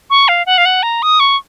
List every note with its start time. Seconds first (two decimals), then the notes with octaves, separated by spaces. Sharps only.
0.10 C#6
0.28 F5
0.46 F#5
0.58 F5
0.65 F#5
0.83 A#5
1.02 D#6
1.20 C#6